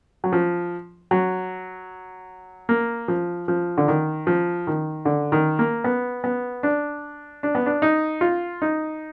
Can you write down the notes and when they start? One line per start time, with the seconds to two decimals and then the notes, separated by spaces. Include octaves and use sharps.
0.24 F#3
0.32 F3
1.11 F#3
2.69 A#3
3.08 F3
3.48 F3
3.78 D3
3.88 D#3
4.27 F3
4.67 D#3
5.05 D3
5.32 D#3
5.59 A#3
5.84 B3
6.24 B3
6.63 D4
7.43 D4
7.55 B3
7.66 D4
7.82 D#4
8.21 F4
8.62 D#4